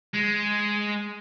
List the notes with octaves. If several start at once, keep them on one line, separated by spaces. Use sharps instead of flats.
G#3